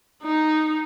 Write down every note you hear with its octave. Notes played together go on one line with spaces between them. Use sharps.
D#4